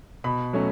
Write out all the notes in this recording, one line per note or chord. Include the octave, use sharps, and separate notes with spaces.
B2 B5
F#3 A3 C#4